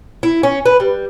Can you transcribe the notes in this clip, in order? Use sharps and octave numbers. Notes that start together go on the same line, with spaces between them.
E4
C#4
B4
G3